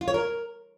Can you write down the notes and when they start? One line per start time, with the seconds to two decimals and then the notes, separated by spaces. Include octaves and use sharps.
0.01 F4
0.08 C#5
0.14 A#4